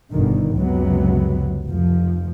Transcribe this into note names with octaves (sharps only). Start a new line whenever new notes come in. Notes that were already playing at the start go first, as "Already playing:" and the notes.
G1 B2 D3 D#3
C#2 F#2 C3 F#3 B3
F1 F2 F3